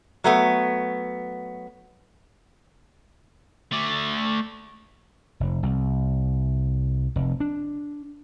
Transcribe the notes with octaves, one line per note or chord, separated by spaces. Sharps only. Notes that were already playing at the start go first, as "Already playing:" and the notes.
F#3 A3 B3
A3 D5
F1
C2
F1
D4